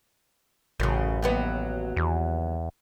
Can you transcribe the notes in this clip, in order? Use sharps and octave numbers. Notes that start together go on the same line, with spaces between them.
A1 F#2 C#3
D#2 F#3 B3
E2